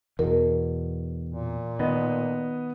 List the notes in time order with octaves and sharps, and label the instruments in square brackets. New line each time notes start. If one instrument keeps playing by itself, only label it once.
[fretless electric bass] E2 B2 [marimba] A#4
[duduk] A#2
[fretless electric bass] D#3 [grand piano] B3 D#5